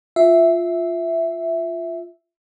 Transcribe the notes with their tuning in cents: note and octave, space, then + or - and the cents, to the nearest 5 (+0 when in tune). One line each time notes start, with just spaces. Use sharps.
F4 +0 E5 +0